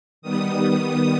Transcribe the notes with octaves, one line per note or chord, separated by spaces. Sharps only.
D#3 G3 B3 D#6